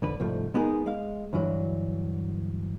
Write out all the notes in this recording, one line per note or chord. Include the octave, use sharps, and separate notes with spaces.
F2 D3 B4
C2 G#2 F3 A3
G#3 B3 D#4 G#4 A#4
G#3 F5
D2 G2 E3 F#3